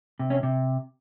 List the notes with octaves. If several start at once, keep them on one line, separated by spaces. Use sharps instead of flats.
C3
C#4
C3